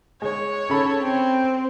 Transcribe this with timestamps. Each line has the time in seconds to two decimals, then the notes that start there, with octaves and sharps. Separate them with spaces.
0.22 G#3 C#5
0.70 C#3 A4 B5
1.02 C4